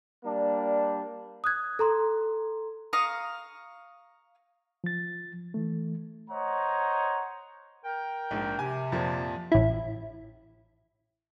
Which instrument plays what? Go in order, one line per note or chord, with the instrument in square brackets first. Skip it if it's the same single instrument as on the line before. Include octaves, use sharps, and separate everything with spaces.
[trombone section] G3 A#3 D4
[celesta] D#6 F#6 G#6
A4 A#5 C6
[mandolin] F5 A#5 C#6 D#6
[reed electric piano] F3 A6
E3 A3
[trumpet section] C5 C#5 D#5 F#5 A#5
[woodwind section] A#4 G5
[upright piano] A#1 G#2
[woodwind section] C3 [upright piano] G#5
[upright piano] F2 A#2 F3
[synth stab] A1 E4